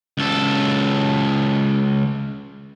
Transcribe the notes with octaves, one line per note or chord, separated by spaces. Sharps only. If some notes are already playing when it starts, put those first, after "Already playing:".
C#2 A4